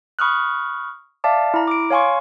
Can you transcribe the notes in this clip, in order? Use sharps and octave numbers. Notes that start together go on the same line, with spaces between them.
B5 C#6 D#6 F6 F#6
D5 E5 F5 A5 D6
E4 A#5
D6 D7
C#5 F5 G#5 C6 C#6